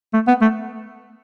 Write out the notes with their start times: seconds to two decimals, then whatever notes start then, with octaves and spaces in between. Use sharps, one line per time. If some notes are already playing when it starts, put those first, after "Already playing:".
0.14 A3
0.28 B3
0.42 A3